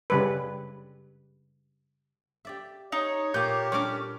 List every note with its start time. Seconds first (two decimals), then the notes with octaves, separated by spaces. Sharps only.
0.10 C#3 G3 B4
2.45 G4 D5 E5
2.92 D#4 C#5
3.34 A#2 A#3 G4 G6
3.72 G3 C#4 D4 A#4 D6